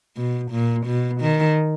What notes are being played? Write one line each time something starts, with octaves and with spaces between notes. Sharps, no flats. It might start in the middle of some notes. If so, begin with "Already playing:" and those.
B2
A#2
B2
D#3